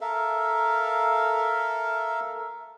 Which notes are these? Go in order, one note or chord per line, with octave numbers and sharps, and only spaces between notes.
A4 A#4 E5 F5